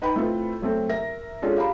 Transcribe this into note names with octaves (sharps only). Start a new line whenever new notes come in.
D#4 B4 G5 B5
A3 C4 E4 F4 A4 B4
F#3 A3 C4 A4
A#4 E5 A#6
G#3 C#4 D4 F4 A4
G4 F5 A#5 B5